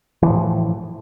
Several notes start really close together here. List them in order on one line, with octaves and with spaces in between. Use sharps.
E3 F3 A2